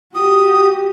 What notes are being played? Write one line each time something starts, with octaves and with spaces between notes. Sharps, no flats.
F#4 G4 D#6